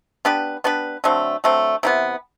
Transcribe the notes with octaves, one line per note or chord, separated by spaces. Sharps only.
B3 D4 G4 B4
B3 D4 G4 B4
D3 F#3 A3 C4
D3 F#3 A3 C4
C3 E3 B3